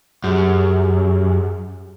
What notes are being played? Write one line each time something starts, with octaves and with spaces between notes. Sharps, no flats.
F#2 G4 G#4